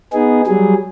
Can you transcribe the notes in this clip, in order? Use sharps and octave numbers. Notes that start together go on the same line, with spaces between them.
B3 D#4 G#4
F#3 G3 G#4